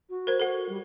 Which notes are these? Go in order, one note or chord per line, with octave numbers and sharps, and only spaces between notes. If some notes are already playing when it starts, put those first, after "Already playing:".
F#4
A#4 C5
A4 F#5
G3